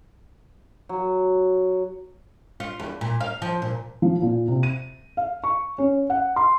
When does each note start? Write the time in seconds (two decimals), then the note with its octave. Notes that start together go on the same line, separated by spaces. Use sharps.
0.89 F#3
2.60 F4
2.80 E2
3.01 A#2
3.20 F5
3.42 F3
3.62 A#2
4.02 F3
4.22 A#2
4.48 C3
4.63 D#7
5.17 F5
5.44 C#6
5.78 C#4
6.10 F#5
6.36 C6